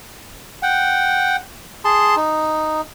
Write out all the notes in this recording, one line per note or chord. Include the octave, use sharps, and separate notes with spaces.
F#5 G5
G#4 A5 C6
D#4